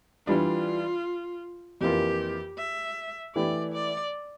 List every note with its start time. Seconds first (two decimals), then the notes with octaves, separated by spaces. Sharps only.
0.27 E3 G3 D4 F4
1.81 F2 E3 A#3 F4 G4
2.58 E5
3.36 E3 A3 E4 G4 D5
3.74 D5